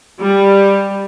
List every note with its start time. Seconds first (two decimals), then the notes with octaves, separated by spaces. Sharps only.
0.21 G3